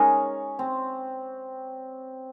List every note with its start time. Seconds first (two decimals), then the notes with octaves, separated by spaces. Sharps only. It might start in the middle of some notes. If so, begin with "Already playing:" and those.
Already playing: G#3 C#4 D#4 A#4
0.59 C4